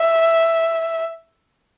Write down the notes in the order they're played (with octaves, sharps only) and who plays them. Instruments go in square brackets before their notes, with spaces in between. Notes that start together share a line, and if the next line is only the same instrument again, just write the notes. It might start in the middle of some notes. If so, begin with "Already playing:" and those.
Already playing: [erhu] E5